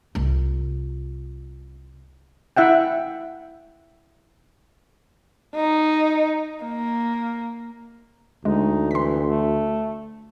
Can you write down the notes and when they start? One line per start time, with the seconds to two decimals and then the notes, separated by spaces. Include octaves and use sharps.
0.15 C2 F4
2.57 E4 E5 F#5 G5
5.55 D#4
6.64 A#3
8.45 D2 G#3 D#4
8.91 E3 C6 B6
9.27 A3